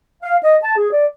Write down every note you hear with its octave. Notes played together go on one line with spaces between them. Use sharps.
F5
D#5
A5
G#4
D5